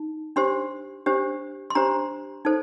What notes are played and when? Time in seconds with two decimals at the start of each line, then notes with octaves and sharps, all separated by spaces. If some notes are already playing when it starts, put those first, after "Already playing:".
Already playing: D#4
0.36 D4 G4 C5 C6
1.06 D4 G4 C5
1.70 C6
1.75 D4 G4 C5 A#5
2.45 D#4 A4 C5